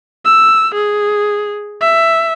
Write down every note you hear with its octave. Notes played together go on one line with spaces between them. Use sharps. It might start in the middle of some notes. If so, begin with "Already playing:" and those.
E6
G#4
E5